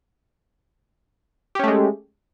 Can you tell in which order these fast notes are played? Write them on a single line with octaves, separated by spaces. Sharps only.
G4 C#4 A3 G#3